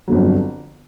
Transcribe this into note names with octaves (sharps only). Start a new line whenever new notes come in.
G1 F2 D3 F#3